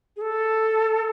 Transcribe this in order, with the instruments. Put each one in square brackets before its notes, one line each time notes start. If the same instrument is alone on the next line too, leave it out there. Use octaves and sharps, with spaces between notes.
[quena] G#4
A4